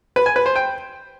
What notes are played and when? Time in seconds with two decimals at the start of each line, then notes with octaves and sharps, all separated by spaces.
0.16 B4
0.26 G#5
0.36 B4
0.46 C5
0.56 G5